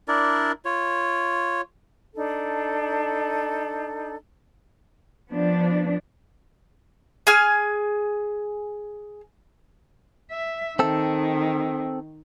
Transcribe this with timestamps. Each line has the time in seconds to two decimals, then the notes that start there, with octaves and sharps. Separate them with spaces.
0.08 D4 E4 A#4 D5
0.65 F4 C#5
2.15 D4 D#4 A4
5.31 F3 B3 D4
7.27 G#4 G#5 F6
10.31 E5
10.79 D#3 C4 A4